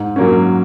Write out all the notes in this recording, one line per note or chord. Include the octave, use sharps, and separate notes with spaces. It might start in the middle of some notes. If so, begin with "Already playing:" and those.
Already playing: G#2
F#3 A#3 C#4